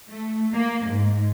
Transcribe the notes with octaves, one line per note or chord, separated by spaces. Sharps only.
A3
A#3
G#2